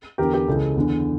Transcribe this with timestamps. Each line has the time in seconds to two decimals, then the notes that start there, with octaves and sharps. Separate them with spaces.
0.18 E2 D3 G4 A#4
0.33 G4 A#4
0.48 C#2 C#3 E3 A4
0.76 E2 D3